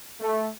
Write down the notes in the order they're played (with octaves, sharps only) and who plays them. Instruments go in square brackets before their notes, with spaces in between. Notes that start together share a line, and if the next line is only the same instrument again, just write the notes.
[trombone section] A3